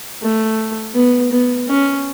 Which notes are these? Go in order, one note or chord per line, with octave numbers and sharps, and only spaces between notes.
A3
B3
B3
C#4